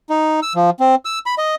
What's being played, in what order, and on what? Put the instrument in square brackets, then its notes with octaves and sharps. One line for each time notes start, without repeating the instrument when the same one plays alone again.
[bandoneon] D#4
E6
F3
C4
E6
B5
D#5